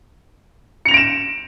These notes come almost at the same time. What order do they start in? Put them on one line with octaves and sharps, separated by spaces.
C#7 F7 A#6 D7 E7